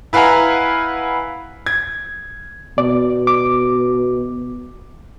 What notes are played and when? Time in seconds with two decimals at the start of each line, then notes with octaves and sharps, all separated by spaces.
0.13 E4 B4 F5 F#5 G#5 A#5
1.66 G#6
2.78 B2 D5
3.27 D6